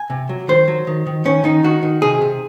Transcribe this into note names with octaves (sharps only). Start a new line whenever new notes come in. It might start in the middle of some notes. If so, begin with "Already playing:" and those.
Already playing: G#5
C3
F#3
D#3 C5
F#3
D#3
D#3
D#3 C#4
D#3 D#4
D#3 F#4
D#3
C3 G#4
C3